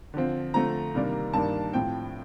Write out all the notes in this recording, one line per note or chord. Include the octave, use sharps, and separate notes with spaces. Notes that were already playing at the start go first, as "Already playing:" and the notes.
D3 F3 C4
D3 F3 A3 C4 A#5
C3 D#3 G3 A#3 D4
G2 D#3 A#3 D4 A5
A2 F3 C4 G5